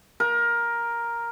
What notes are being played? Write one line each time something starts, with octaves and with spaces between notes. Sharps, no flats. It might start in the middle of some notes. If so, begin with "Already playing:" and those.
A#4